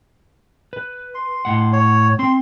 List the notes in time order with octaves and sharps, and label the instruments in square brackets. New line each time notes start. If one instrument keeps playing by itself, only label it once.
[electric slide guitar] B4
[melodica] C6
[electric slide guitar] A2 F#5
[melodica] C#5
[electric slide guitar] C4 [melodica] C6